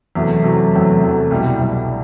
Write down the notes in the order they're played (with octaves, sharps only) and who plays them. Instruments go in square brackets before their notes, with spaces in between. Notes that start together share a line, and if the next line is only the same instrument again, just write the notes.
[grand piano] E2 C3 F#3 A3
E2 C3 F#3 A3
E2 C3 F#3 A3
E2 C3 F#3 A3
C2 B2 G3
C2 B2 G3